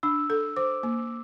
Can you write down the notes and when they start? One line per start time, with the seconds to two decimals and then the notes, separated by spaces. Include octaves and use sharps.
0.03 D4 E6
0.30 A4
0.56 C5 D6
0.83 A#3